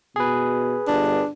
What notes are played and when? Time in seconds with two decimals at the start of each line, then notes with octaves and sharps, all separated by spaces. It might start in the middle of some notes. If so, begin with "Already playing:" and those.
0.16 B2 G#4 B4
0.88 G1 D4